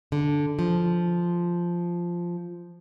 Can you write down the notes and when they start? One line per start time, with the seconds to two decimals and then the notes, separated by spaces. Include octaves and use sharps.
0.12 D3
0.59 F3